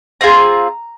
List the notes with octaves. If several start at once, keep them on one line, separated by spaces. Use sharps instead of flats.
C4 F4 G#4 A#5